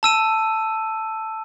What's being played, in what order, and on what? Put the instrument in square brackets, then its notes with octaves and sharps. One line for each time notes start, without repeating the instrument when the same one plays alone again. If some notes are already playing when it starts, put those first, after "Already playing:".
[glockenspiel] A5 E6 D#7